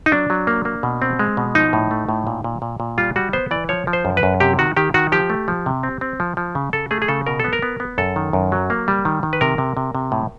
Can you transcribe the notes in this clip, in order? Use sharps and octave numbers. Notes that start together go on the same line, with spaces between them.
D#4
F#3 D4
F#3
A#3
A#3
B2
C4
G#3
B2
F3 D#4
A2
A3
A2
A#2
A#2
A#2
A#2
G3 F4
G3 F#4
B3 C5
E3 D5
F3 C#5
F3
C5
F#2
B4
F#2
C3 G4
D#3 F#4
D#3 G4
D#3 F#4
F3 G4
A3
F3
C3
C4
C4
F3
F3
C#3
C#3 A4
A3 G#4
G#4
C#3 A4
B2 A#4
B3 A4
A#4
B3
B3
F#2 A4
D#3
F#2
F#3
A#3
G3
D#3
D#3
B4
C3 A#4
C3
C3
C3
A2